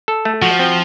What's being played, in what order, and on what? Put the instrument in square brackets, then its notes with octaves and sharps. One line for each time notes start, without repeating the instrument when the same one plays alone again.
[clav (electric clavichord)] A4
A3
[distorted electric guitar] F3 [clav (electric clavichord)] F#4
[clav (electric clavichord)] C4